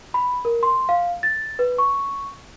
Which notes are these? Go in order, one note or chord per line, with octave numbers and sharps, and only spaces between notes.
B5
A#4
C6
F5
A6
B4
C#6